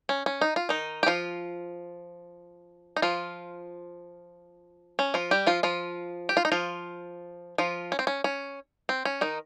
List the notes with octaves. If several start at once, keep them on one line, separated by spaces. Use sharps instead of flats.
C#4
C#4
D#4
F4
D#3 D#4
G4
F3 F4
D#4
F3 F4
C#4
F3 F4
G3 G4
F3 F4
F3 F4
G4
F4
D#4
F3 F4
F3 F4
C#4
C4
C#4
C#4
C4
C#4
D#3 D#4